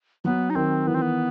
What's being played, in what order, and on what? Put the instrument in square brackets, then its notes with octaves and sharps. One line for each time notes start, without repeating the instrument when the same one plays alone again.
[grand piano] F#3 [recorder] B3
[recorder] D#4
[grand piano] D#3 [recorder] C4
[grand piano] E3 [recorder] B3
[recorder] C4
B3